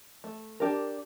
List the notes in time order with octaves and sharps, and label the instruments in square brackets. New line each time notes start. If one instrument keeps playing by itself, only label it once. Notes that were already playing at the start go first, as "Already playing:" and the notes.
[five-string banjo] A3
D4 G4 A#4